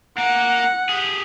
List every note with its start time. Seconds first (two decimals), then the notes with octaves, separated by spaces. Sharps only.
0.18 A#3 F#5
0.89 G4 G#4